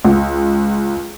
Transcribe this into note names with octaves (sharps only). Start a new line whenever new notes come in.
C#2